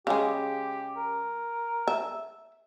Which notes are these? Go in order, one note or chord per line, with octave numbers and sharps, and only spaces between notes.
C#3 G#3 G4
A#4
E5